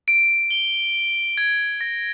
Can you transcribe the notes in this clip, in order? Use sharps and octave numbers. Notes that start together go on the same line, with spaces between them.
D7
G7
G7
G#6
A#6